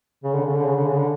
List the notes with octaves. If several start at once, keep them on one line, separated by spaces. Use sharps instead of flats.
C#3
D3
C#3
D3
C#3
D3
C#3
D3